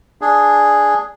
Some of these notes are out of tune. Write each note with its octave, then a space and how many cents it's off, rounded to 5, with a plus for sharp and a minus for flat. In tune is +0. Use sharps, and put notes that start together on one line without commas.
D4 +0 G#4 +0